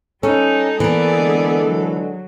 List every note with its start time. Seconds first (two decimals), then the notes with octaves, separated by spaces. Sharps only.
0.23 G3 C#4 D#4 A4
0.80 E3 A#3 B3 G#4 D5
1.17 D3 G#3
1.65 F#3